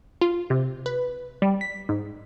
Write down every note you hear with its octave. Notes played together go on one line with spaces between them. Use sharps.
F4
C3
B4
G3
B6
G#2